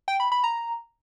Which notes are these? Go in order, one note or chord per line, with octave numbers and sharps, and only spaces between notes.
G5
B5
B5
A#5